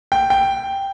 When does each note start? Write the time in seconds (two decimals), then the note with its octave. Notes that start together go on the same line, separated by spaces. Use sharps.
0.12 G5
0.30 G5